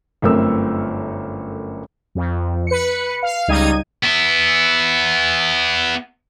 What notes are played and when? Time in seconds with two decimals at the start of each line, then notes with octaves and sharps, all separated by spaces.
0.22 G1 F#2 A3 C4 A#4 E6
2.15 F2
2.67 B4 C#7
3.23 F5
3.48 C#2 G3 D#4 D#5 G#6 D#7
4.03 B3 E4